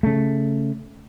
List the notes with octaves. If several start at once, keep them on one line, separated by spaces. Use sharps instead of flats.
C#3 A3